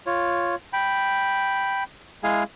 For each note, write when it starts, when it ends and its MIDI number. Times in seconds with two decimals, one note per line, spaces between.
0.06 0.55 65
0.06 0.55 73
0.73 1.84 79
0.73 1.84 83
2.24 2.43 56
2.24 2.43 64
2.24 2.43 68
2.24 2.43 77
2.24 2.43 80